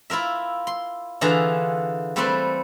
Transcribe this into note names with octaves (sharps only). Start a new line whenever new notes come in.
E4 F4 A#4 E5
C6
D3 E3 F4 G#4 E5 A#5
G3 A3 C4 A4 B4 C6